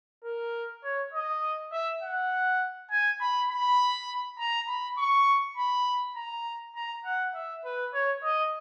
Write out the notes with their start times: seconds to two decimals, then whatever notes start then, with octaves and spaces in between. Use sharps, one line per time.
0.24 A#4
0.84 C#5
1.14 D#5
1.72 E5
2.02 F#5
2.91 G#5
3.21 B5
3.50 B5
4.39 A#5
4.68 B5
4.98 C#6
5.57 B5
6.16 A#5
6.76 A#5
7.05 F#5
7.35 E5
7.64 B4
7.94 C#5
8.23 D#5